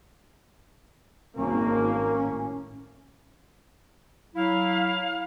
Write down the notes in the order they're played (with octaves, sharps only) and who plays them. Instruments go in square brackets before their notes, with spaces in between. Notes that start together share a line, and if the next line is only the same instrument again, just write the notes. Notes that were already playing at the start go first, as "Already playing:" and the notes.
[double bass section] G#1 C4 [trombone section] A#3 [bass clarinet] C#4
[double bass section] A2
[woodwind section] F#3 E4 [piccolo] F5